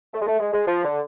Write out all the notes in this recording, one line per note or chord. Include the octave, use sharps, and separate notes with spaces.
A3
G#3
A3
G#3
G#3
F3
D3